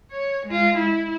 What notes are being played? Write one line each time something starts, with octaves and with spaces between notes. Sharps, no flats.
C#5
G#3 F4
E4